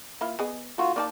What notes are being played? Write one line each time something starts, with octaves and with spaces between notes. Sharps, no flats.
A#3 E4 F4
B3 G#4 D#5
A3 D#4 F4 F#4
A#3 D#4 D5 A5